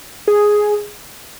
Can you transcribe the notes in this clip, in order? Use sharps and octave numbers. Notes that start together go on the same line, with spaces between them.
G#4